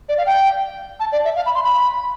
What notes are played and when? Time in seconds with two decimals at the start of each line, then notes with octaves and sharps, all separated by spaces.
0.09 D5
0.18 F5
0.26 G5
1.00 A5
1.12 D5
1.25 E5
1.36 F5
1.46 B5
1.55 C6
1.64 B5